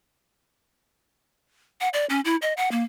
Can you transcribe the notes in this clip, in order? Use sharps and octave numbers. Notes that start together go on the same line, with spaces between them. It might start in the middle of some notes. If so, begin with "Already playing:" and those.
F#5
D5
C#4
E4
D#5
F#5
A#3